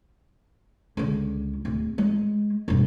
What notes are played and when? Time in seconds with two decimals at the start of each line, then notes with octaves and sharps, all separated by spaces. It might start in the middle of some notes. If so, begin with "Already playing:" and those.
0.97 C#2 D3
1.65 D1
1.98 G#3
2.68 E1 G2